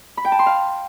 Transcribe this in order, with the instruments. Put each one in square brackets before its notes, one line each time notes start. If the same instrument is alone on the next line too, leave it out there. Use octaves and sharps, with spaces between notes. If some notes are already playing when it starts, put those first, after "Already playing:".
[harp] B5
G5
A5
C6
F5